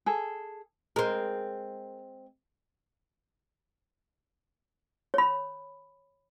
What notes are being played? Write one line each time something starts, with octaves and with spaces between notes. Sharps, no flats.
G#4 A4
G#3 C4 A#4
C#5 B5